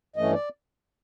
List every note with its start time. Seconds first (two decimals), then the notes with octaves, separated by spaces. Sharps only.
0.16 G2 E3 A3 C#4 D#5
0.33 D5